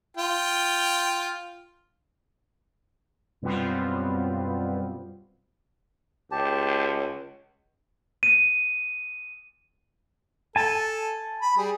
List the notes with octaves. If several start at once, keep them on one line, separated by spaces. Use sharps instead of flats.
F4 G5
F#2 B2 G3 B3 C4 F4
C#2 G4 A5
D#7
A4 G#5 A5
B5
G3 G#4